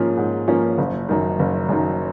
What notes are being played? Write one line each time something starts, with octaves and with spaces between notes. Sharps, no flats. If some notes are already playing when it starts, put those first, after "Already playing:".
Already playing: G#2 F3 A#3 C#4
G#2
F3 A#3 C#4
F#1
F#2 D#3
F#1
F#2 D#3